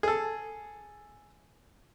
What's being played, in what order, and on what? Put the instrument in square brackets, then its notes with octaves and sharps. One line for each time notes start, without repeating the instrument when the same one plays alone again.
[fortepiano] G#4 A4